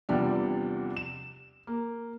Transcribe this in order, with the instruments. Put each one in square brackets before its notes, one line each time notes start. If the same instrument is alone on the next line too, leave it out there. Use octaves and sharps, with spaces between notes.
[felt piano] E2 C3 F3 G3 D4
E7
A#3